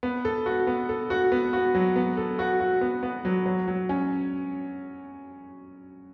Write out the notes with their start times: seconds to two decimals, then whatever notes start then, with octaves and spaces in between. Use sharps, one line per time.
0.03 B3
0.25 A4
0.46 F#4
0.67 B3
0.89 A4
1.10 F#4
1.32 B3
1.53 F#4
1.75 F#3
1.96 B3
2.17 A4
2.39 F#4
2.60 F#4
2.81 B3
3.03 B3
3.25 F#3
3.46 F#3
3.68 F#3
3.89 C#4